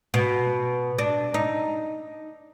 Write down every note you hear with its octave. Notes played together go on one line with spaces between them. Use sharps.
B2
D4
D#4